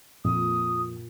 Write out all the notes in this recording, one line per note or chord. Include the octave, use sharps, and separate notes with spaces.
F2 A#2 D#6